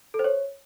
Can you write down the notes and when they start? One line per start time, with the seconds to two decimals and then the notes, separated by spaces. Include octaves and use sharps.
0.14 A4
0.19 C5
0.24 C#5